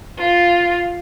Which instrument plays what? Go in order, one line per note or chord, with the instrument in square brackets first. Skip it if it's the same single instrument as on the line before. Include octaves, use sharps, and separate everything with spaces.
[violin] F4